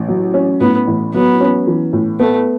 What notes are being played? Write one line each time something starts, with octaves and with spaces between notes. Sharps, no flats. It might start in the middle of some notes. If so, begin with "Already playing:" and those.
Already playing: A1
F#3
C#4
A2 B3
A1
F#3 B3
C#4
E3
A2
A3 B3